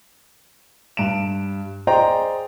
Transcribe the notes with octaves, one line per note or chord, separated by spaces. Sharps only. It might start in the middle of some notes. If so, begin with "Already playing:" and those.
G2 D7 E7
G#4 C5 D5 D#5 G5 A#5